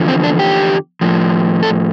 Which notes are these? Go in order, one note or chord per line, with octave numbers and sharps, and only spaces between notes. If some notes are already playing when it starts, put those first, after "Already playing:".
Already playing: E2 D3 F3
C4
D4
G4
A2 F3
A4